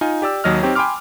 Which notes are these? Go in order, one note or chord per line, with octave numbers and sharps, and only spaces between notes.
D#4 F4 G#5
G4 D5 E6
D#2 F#3 D#5 F6
C4 D#4 G4 C#5
G5 G#5 B5 C6 D6 F6